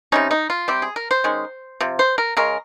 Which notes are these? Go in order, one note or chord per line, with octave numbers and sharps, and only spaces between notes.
C3 G3 C#4 D#4
D#4
F4
C3 G3 C4 G4
G#4
A#4
C5
D#3 G#3 C#4
C3 F3
C5
A#4
C#3 G#3 C#4 A#4